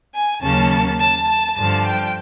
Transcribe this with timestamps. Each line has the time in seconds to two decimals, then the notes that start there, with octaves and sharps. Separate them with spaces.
0.14 G#5
0.42 D#2 C#3 F#3 A#3 C#4 A5
1.00 A5
1.29 A5
1.57 G2 D3 F3 A5
1.86 G5